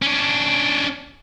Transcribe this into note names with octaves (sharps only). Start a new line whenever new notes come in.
C#4 D4